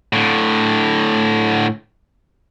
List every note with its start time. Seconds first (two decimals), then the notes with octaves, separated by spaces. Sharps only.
0.13 A2 D3